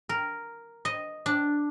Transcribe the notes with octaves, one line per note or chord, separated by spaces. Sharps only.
A#4
D#5
D4